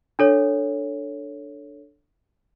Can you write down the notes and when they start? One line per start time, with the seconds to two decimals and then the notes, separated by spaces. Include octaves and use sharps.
0.19 D4 A4 C#5